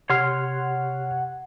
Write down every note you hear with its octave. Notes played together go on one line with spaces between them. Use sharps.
C3 G4 C#5 F#5 C6 F6 C7